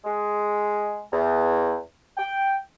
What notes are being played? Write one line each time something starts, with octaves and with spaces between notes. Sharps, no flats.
G#3
E2
G5